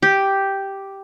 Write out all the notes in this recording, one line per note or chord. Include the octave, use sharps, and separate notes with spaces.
G4